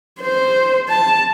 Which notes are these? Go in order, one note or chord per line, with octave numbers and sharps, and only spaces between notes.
C5
A5